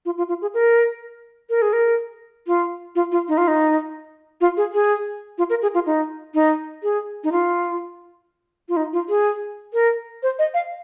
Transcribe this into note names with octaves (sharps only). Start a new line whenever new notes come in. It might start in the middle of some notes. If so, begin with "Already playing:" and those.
F4
F4
F4
G#4
A#4
A#4
G#4
A#4
F4
F4
F4
D#4
F4
D#4
F4
G#4
G#4
F4
A#4
G#4
F4
D#4
D#4
G#4
D#4
F4
F4
D#4
F4
G#4
A#4
C5
D#5
F5